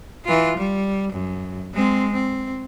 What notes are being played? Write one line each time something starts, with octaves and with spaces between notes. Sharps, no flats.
E3 F4
G3
F#2
G#3 C4
C4